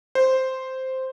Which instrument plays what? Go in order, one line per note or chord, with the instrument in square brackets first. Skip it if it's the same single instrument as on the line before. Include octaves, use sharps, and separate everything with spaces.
[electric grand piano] C5